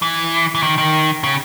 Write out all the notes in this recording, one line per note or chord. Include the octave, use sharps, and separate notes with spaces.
E3
E3
D#3
D#3
C#3